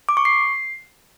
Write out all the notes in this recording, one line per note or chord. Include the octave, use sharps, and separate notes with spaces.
D6
C#6
C7